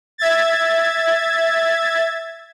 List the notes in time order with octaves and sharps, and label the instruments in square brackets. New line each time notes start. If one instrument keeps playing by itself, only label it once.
[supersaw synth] E5 G#6 A6